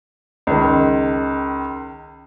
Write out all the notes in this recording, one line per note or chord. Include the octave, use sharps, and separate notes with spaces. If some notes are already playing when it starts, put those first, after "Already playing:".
C#2 D#3